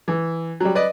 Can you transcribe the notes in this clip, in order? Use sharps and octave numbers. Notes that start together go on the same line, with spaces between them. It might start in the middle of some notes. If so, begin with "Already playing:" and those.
E3
F#3 G3
B4 D5 D#5